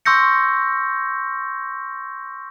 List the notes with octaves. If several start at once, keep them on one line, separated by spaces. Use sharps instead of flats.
C6 C#6 E6 G6 A#6 C#7